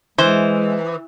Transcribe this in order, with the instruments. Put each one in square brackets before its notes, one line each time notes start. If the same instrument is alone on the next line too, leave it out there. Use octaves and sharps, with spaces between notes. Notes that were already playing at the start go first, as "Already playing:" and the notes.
[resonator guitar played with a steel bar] E3 [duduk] G#3 [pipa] C5